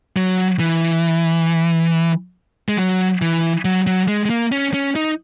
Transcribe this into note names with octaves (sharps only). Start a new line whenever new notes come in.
F#3
E3
G#3
F#3
E3
F#3
F#3
G#3
G#3
A#3
C#4
C#4
D#4